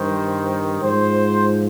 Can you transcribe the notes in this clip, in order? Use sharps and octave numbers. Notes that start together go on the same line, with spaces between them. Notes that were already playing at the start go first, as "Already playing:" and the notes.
Already playing: G2 D#3 C5
G#2 F3 C5